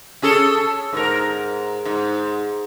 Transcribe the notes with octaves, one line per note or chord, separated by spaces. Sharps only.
C#4 G#4 A4
G#2 A#4
G#2